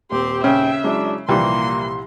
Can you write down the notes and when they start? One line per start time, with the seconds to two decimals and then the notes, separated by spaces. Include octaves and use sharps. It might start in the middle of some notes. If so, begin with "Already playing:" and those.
0.12 D#1 C4 G4 C6
0.44 C#3 E5 G5
0.84 F#3 G#3 D4 E4
1.29 C2 A#2 E3 F3 G3 A#3 C6